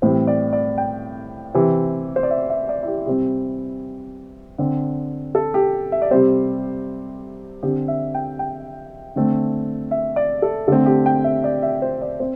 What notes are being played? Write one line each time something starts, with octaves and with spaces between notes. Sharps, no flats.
A2 E3 G3 C4 C5
D5
D5
G5
C3 E3 C4
C5
D5
E5
E5
D5
E4
G4
C3 G3 C4 G4
D3 C4
A4
G4
E5
D5
C3 G3 C4 C5
D3 C4 G4
E5
G5
G5
D3 A3 C4
E5
D5
A4
D3 A3 C4 A4
G4
G5
E5
D5
E5
C5
D5
C4 C5